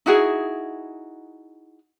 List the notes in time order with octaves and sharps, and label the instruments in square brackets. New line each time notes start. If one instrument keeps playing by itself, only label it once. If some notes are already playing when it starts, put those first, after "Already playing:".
[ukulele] D#4 E4 F#4 G#4